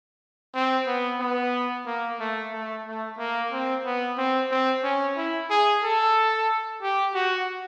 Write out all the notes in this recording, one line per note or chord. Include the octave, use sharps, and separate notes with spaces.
C4
B3
B3
A#3
A3
A3
A3
A#3
C4
B3
C4
C4
C#4
E4
G#4
A4
G4
F#4